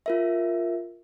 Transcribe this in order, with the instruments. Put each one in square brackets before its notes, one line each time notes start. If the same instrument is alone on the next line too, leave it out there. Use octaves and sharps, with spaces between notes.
[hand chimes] F4 A#4 E5